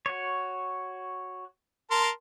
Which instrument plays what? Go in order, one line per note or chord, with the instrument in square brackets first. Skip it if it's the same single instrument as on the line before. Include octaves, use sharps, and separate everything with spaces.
[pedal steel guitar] F#4 C#5
[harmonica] A#4 A5 C6